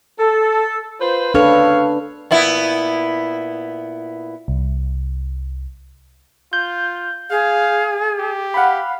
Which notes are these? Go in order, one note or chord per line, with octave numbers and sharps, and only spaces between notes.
A4
F4 B4 C5
C#3 D4 A4 B4 C#5 F5
A#2 B3 E4
C2
F4 G6
G#4 F5
G4
F5 F#5 B5